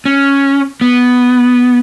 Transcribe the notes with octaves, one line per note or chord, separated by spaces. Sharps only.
C#4
B3